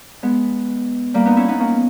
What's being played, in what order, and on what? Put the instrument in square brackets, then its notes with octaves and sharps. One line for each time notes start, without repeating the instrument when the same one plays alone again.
[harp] G#3 B3
G3 A#3
B3 D#4
C#4 E4
B3 D#4
A#3 C#4